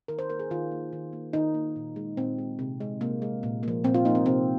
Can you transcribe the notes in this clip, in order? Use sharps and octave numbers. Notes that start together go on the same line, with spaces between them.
D#3 A#4
C5
A#3 A#4
G#4
D#3 F4
A#3
D#3
A#3
D#3 D#4
A#3
A#2
G#3
A#2 C4
G#3
C3
G#3
C3 A#3
G#3
A#2
F3 A#3
A#2 C4
F4
F3 A#3 D#4
C4
C3 C4